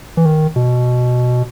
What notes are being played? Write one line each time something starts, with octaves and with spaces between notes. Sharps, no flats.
E3
D#3
B2